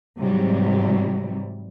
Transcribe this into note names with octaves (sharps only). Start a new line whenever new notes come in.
G#2 C3 E3 F#3 G3